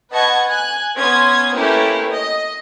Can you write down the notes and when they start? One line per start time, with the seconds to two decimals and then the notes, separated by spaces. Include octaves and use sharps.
0.11 B4 D#5 F#5 A5 C#6 G#6
0.48 G#5 F#6
0.97 B3 C#4 C6 D#6 G#6
1.55 A3 A#3 C#4 E4 G4 B4
2.10 D#5